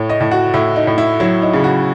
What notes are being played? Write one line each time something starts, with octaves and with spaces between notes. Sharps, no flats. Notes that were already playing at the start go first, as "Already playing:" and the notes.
Already playing: A2 C#5
D#5
A2
F#4
A2 E4
D#4
A2
E4
F#3 E4
D#4
C#3
F#4